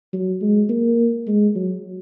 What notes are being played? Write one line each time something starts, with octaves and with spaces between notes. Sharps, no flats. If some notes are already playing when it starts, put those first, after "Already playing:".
F#3
G#3
A#3
G#3
F#3